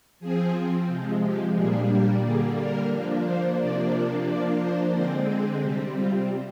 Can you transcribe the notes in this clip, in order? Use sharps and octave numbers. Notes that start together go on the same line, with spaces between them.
F3 C4 G#4
C3 F3 G#3
G4
A#2 G3 A#3 D4 G#4
G4
D3 G3 A#3 D4 G#4
A#4
F3 A#3 D4
C5
C3 F3 A#3 D4 D5
F3 A#3 D4 D5
C5
D3 G#3 C4 C5
G#4
C3 G3 C4 G4
F4